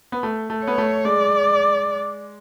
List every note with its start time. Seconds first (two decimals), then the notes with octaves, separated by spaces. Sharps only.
0.12 B3
0.23 A3
0.50 A3
0.64 B3 C#5
0.78 A3
1.05 G#3 D5